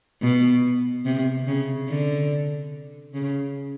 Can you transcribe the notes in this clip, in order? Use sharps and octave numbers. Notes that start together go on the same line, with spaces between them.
B2
C3
C#3
D3
C#3